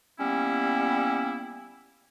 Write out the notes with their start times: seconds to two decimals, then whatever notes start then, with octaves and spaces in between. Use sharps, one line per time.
0.20 G3 A#3 B3 C#4 E4